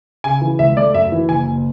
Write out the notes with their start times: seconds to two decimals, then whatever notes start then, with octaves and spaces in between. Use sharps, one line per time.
0.24 C#3 G#5
0.42 E3
0.59 C#2 E5
0.76 A3 D5
0.94 F#2 E5
1.12 E3
1.29 F#1 G#5
1.46 F#1